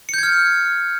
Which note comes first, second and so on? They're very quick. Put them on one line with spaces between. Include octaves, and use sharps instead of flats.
C#7 G6 G#6 F6